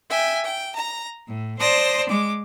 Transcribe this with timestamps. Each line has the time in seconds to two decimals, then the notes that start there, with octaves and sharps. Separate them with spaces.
0.11 E5 G5 G#5
0.46 G5
0.76 A#5
1.26 A2
1.58 C5 D5 A5 C6 D#6 A#6
2.07 G#3 D6